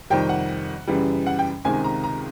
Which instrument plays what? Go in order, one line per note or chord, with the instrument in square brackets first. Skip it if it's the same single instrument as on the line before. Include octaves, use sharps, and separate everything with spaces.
[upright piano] F2 C3 D#3 G3 G5
F#5
F#2 C#3 E3 G3
F#5
G5
C#2 C3 D#3 G#3 G#5
A#5
A#5